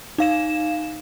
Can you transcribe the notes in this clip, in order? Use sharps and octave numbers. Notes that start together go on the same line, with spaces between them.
D#4 F5 E7